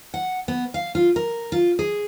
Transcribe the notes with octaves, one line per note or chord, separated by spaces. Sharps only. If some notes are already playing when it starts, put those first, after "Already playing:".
F#5
B3
F5
F4
A#4
F4
G#4